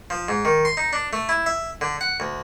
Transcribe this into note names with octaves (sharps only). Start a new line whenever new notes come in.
F3
G#2
D#3
C6
D#4
D4
A3
E4
E5
D3
F#5
D2